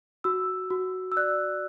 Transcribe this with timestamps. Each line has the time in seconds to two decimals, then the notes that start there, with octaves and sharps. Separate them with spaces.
0.24 F#4 E6
0.70 F#4
1.12 E6
1.17 D5 F#6